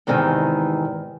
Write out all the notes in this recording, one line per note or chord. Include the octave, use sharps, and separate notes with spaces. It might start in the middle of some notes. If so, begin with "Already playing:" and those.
E2 G#2 C3 D#3 E3